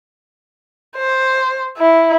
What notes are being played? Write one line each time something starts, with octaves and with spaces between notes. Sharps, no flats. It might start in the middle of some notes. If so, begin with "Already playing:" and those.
C5
E4